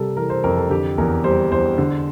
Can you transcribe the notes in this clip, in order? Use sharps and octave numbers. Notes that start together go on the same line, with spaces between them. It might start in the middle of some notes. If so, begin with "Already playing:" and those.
Already playing: C3 G3 A4 A#4
E3 A#4
C5
F2 A#4
A4
D3 G4
E2 A#4
G3 C5
E2 C5
D3